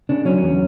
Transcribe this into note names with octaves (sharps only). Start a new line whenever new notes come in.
C#3 D4
F#3 C#4
E2